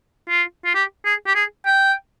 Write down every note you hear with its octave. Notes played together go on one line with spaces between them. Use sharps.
F4
F4
G4
G#4
G4
G#4
G5